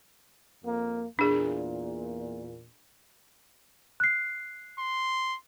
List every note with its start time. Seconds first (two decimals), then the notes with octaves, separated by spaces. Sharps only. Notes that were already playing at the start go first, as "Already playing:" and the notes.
0.64 F2 A#3
1.19 E2 A#2 D4 G#4
4.00 F#6 C7
4.79 C6